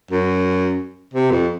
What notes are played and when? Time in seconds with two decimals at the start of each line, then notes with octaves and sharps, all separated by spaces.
0.11 F#2
1.14 C3
1.31 F2